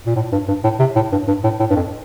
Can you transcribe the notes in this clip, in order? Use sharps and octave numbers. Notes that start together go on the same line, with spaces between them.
A#2
A2
G2
G2
A2
C3
A2
G2
G2
A2
A2
G2
F2